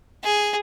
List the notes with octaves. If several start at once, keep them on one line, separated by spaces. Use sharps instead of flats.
G#4